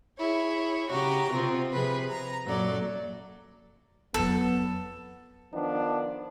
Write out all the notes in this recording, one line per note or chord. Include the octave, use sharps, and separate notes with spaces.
E4 G#4 C#5
C#3 F#4 G4 A#5
C3 F3 C4
C3 F3 G#4 B4 B5
A#5
F#2 A#2 F#3 A4 D5
F2 F#3 B3 A4
D#3 F3 B3 D4